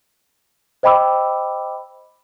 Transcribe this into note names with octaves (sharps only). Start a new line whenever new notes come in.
C5 D#5 G5 B5 D6 E6